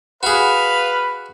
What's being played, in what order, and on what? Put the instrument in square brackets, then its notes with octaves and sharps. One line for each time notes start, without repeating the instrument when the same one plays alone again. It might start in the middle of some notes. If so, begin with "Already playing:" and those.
[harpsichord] F#4 G#4 [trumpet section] B4 [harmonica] F5